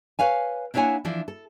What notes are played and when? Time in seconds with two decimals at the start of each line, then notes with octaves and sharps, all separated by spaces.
0.19 B4 C#5 F5 G#5
0.74 A#3 D4 E4 C#5 F#5 G#5
1.05 E3 F3 D4 E4
1.28 A4